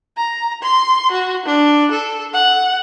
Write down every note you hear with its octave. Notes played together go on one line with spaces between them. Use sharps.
A#5
C6
F#4
D4
A4
F#5